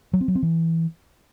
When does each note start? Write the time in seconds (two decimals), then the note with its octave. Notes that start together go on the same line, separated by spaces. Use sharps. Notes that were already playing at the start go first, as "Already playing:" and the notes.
0.13 F#3
0.21 C4
0.28 F#3
0.35 C4
0.43 E3